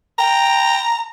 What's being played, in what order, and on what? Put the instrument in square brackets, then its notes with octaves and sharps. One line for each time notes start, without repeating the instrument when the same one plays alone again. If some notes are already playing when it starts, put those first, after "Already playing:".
[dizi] G5 [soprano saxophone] A#5